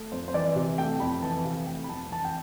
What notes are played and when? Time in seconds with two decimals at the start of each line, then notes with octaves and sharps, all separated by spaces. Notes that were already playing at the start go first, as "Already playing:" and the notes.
Already playing: A3
0.12 F2 C5
0.28 C5
0.34 E3 D5
0.56 C3
0.78 A3 G5
1.00 F2 B5
1.22 E3 A5
1.45 C3 F5
1.67 A3 G5
1.84 B5
1.89 F2 A5
2.11 E3 A5
2.25 G5